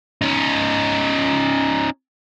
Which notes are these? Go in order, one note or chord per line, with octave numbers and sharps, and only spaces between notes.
C#4 D#4